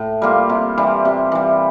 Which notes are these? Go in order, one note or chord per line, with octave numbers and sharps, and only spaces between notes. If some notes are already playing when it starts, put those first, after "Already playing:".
Already playing: A2
G3 A#3 F4
C3
E3 G3
C3
E3 G3